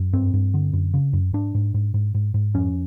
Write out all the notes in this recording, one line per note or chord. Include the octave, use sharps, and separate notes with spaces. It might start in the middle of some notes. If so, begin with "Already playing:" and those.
Already playing: F#2
G2 C4
G2
D3
F#2
C#3
F#2
G#2 D4
G#2
G#2
G#2
G#2
G#2
F2 C#4